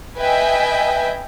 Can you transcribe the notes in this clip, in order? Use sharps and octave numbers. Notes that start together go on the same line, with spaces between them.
B4 D#5 E5 G5 G#5